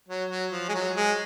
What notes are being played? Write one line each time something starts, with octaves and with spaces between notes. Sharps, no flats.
F#3
F#3
F3
G#3
F#3
G#3